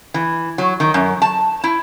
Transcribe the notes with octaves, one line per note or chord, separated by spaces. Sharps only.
E3
F#3
D#3
F#2
A5
E4